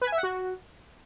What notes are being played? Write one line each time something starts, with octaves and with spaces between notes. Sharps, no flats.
B4
G#5
E5
F#5
F#4